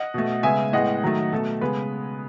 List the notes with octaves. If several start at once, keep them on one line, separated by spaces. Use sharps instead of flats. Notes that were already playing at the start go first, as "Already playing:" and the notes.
Already playing: D#5 F#5
B2 A3
C#3 G#3 B3 E5 G#5
A2 G#3 B3 D#5 F#5
D#3 F#3 A3
B2 A3 A4
C#3 G#3 B3 B4